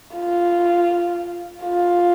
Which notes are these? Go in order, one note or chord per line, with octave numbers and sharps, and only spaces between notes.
F4
F4